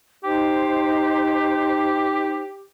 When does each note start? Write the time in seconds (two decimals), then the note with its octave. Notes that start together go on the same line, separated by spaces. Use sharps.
0.24 D#4 G4 C5